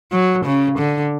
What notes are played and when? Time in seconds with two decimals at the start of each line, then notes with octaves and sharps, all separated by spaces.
0.12 F#3
0.45 C#3
0.78 D3